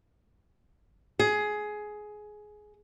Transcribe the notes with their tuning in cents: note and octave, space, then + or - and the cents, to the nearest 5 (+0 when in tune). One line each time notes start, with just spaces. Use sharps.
G#4 +15